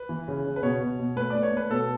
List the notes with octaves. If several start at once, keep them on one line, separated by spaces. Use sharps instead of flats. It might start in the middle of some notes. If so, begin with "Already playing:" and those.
Already playing: B4
E3
C#3
C#3
B4
B2 C#5
B2
B2
A3 B4
A3 D5
C#5
A3
B4
B2 A4